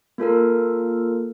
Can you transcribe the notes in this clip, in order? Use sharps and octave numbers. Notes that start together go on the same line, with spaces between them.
A#3 F4 A4 A#4